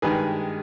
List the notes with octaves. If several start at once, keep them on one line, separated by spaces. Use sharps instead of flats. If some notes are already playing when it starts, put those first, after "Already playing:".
G2 D#3 G#3 G#4 B4